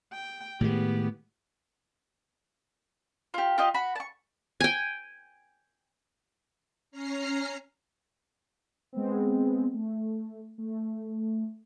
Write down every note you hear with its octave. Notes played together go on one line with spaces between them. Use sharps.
G5
A2 D#3 G#3 B3 G4
F4 G4
F4 G4 D#5
F#4 B5
A5 C#6
G5 G#5
C#4 A#5 F6 C7
G#3 B3 C4
A3
A3